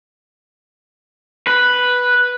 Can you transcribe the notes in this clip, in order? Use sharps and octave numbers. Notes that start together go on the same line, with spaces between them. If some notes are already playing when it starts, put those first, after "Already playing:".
B4